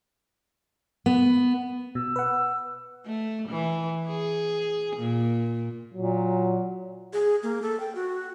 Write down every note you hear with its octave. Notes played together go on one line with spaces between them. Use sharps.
B3
B2 E6
B4 F#5
A3
E3
G#4
A#2
A#2 F#3
G#4
A#3
A4
G5
F#4